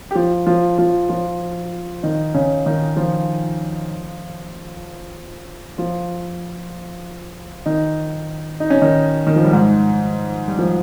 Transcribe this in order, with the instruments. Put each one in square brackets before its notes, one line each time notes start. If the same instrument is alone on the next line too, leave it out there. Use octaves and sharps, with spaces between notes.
[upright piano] G4
F3 F4
F3 F4
F3 F4
F3 F4
D#3 D#4
C#3 C#4
D#3 D#4
F3 F4
F3 F4
D#3 D#4
D#4
C#4
D#3 D#4
D#3
F3
G3
G#2 G#3
G3
F3